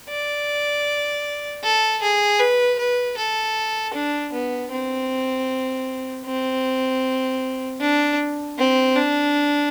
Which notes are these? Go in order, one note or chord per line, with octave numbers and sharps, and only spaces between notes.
D5
A4
G#4
B4
B4
A4
D4
B3
C4
C4
D4
C4
D4